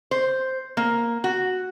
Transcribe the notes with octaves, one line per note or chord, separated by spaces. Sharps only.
C5
A#3
F#4